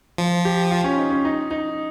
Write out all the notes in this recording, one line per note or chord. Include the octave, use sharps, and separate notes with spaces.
F3
G4
F4
C#4
D#4
C#4
D#4
D#4